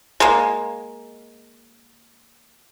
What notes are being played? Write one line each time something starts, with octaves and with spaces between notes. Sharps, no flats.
G#3 A#3